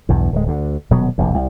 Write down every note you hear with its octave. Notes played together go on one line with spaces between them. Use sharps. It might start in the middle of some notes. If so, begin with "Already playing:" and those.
B1 E2 G2
D1 G#3
D2 D3
D#1 B2 F#3 B3
F1 A#1 E2
C2